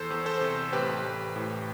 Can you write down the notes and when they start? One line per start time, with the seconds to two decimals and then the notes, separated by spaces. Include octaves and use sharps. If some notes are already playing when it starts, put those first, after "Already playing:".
Already playing: E2 A4 C5
0.10 E2
0.26 A4 C5
0.41 C3
0.73 A1 G4 B4
1.04 A1
1.36 A2